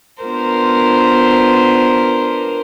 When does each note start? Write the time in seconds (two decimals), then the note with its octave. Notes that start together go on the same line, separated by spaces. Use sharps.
0.23 B3 D4 F4 A#4 C5